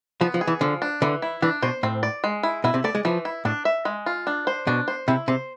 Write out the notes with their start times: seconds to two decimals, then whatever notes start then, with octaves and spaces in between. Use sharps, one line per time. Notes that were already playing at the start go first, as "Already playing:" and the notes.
0.21 F3 B3
0.34 F3
0.41 G#4
0.47 E3
0.61 D3 F3
0.82 D4
1.02 D3 E3
1.22 E4
1.42 E3 D4
1.62 B2 C5
1.83 A2 C4
2.03 D5
2.24 G#3
2.43 E4
2.64 B2 E4
2.74 C3
2.84 A3 D5
2.95 G#3
3.05 E3 F3
3.25 E4
3.45 A2 D4
3.65 E5
3.85 G#3
4.06 F4
4.27 D4
4.47 C5
4.67 B2 D4
4.88 C5
5.08 C3 E4
5.28 C3 C5